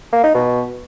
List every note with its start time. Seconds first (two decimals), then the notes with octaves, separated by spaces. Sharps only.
0.12 A#3
0.23 D#4
0.34 B2